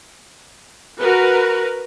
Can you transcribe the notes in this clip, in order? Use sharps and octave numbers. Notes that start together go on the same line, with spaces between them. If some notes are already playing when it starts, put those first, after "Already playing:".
F#4 A#4 B4